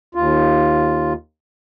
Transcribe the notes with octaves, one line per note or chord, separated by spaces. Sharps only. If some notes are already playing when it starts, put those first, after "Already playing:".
D#2 F4